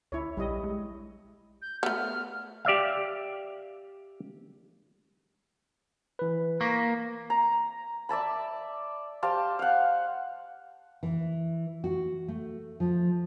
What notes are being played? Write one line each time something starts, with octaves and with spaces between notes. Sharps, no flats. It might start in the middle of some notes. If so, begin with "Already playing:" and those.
D2 E4 C#5
A#1 G3 E4 D#5
G#3
G6
A3 B3 F6
G4 D5 E5 F5
E3 B4
A#3 C#6 A#6 B6
A#5
D5 E5 A5 B5
G4 C5 F5 A5
F5 F#5
E3
F#4
A3
F3